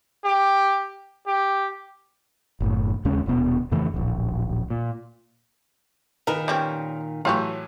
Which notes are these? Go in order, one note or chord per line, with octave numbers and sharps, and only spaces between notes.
G4
G4
F#1 A2
D#2 C#3 G#3 C#4
D#1 B2 B3
F2 C#3 E3 A3
D1 A#1
A#2
A#2 D#3 D#4 A#4 B4
G3 C4 C#4
A2 E3 F#3 F4 G4 C#5